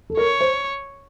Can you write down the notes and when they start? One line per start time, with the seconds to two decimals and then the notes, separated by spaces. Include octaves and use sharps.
0.10 A4
0.17 A#4 C#5
0.41 C5